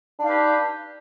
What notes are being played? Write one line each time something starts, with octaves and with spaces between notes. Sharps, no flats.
D4 D#4 G4 B4 F5